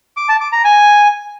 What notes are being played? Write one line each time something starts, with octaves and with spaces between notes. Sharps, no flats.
D6
A5
D6
A#5
G#5